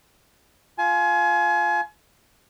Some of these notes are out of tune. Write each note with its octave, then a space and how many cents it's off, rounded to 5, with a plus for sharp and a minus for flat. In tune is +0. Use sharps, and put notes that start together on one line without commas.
F4 +0 G#5 +30